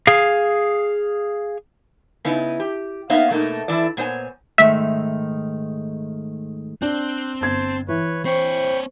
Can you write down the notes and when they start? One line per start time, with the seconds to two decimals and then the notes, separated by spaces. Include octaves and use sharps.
0.07 G#4 F5
2.25 C#3 B3 D#4 E4
2.60 G4
3.10 A#3 B3 D#4 C#5 E5 F5
3.30 B2 A3 A#3 D#4
3.68 E3 E4 A4 D5
3.97 A#2 B3 C5 C#5 G#5
4.58 G#2 D#3 A3 E5
6.82 C4 D4 F#6 G6
7.41 G1 C5 A5 G#6
7.88 E3 B4 C#5
8.25 C4 C5 C#5 G5 B5 C#6